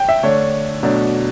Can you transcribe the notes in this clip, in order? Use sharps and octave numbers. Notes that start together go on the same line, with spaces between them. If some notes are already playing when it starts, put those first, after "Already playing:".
Already playing: G5
E5
D3 A3 D4 C#5
B2 F#3 A3 D4